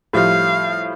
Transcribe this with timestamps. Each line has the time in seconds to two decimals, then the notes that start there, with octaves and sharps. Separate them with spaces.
0.13 A2 F3 G3 F5